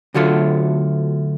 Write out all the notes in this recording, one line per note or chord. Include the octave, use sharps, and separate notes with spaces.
D2 D3 F#3 A3 F4